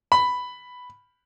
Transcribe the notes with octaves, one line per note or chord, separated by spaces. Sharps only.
B5